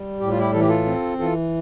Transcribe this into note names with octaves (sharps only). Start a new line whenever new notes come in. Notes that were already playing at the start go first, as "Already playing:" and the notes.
Already playing: G3
A2 G4
F4
E4 G4
E3 A4
G4
F4 A4
C4
E3 F4 A4